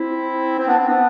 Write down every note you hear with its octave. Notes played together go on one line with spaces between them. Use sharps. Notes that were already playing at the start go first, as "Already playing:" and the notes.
Already playing: C4 E4
C4
B3 D4
C4
B3 D4